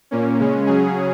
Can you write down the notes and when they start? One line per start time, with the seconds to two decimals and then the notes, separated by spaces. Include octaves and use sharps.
0.11 A#2 A#3 C#4
0.39 C#3 G#3 C#4
0.66 C#3 F#3 C#4 G#4